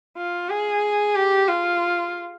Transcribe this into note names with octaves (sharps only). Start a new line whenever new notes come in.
F4
G#4
G4
F4